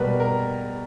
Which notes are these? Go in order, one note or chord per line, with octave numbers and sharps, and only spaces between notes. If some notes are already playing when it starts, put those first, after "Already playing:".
Already playing: B2 G3 A#4 B4
A#4